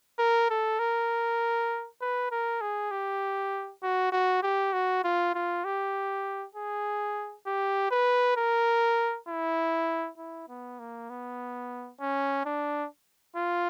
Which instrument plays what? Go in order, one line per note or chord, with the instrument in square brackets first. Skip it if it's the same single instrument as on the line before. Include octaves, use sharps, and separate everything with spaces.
[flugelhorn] A#4
A4
A#4
B4
A#4
G#4
G4
F#4
F#4
G4
F#4
F4
F4
G4
G#4
G4
B4
A#4
E4
E4
B3
A#3
B3
C#4
D4
F4